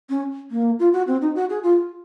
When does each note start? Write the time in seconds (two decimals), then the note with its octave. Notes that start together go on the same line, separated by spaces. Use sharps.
0.10 C#4
0.51 A#3
0.79 F4
0.93 F#4
1.07 C4
1.21 D#4
1.35 F#4
1.50 G#4
1.63 F4